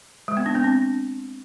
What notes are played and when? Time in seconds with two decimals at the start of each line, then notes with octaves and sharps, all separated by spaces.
0.28 G#3
0.37 B3
0.46 D4
0.55 C4
0.64 D4